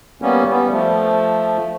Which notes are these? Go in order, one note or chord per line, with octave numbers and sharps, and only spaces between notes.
G3 A#3 B3 C#4
G3 B3
F3 A3